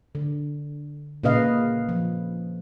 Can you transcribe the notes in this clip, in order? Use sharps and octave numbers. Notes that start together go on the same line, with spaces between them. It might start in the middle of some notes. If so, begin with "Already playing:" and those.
D3
A#2 C#3 B4 D#5 F5
F3